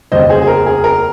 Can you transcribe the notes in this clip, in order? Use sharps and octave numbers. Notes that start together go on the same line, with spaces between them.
F1 D#2 C#3 C5 D#5
G#4 C5
G#4
A#4
G#4
A#4